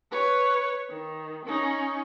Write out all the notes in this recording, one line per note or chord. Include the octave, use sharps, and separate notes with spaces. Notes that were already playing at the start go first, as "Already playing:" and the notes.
B4 C#5
D#3
C#4 D#4